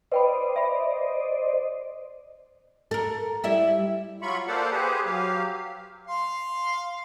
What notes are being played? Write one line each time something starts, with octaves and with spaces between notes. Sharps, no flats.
B4 C5 D5 D#5 G5 B5
E5 B5
A4 A#4
G3 E4 E5
F#3 F4 B5 C#6
A#3 A4 C5 D5 F5 F#5
G4 G#4 B4 C5
F#3 G4 F5
F5 C6